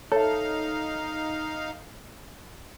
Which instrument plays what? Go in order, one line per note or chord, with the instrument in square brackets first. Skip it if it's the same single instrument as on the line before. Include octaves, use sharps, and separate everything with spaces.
[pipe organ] D#4 F5 [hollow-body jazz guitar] A4 [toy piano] C#5 E5